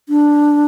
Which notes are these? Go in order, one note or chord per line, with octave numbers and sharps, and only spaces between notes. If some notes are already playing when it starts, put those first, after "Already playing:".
D4